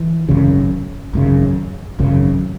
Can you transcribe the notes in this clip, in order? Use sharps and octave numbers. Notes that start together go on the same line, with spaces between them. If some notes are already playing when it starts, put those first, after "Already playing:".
Already playing: E3
G#1 F#2 C#3
G#1 F#2 C#3
G#1 F#2 C#3